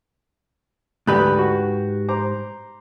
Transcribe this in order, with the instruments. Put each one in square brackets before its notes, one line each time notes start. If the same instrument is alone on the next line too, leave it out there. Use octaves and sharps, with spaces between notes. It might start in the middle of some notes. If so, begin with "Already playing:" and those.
[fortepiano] D2 B5 F#6 [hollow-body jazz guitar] G#2 G4 B4
[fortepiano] F#4
C5 A#5 D6